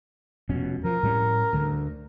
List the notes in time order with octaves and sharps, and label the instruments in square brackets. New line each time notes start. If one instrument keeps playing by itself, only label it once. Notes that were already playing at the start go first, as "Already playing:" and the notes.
[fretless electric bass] F1 B2 C#4
[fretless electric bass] F3 [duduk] A#4
[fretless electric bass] A2 G3 C#4
D2 D3